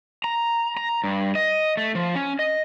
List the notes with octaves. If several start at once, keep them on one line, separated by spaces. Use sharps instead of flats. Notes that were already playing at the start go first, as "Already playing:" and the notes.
A#5
A#5
G2
D#5
A3
F3
C#4
D#5